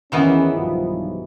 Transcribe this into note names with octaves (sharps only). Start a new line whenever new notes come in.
E2 D#3 E3 B3 C#4
B1 G2 F3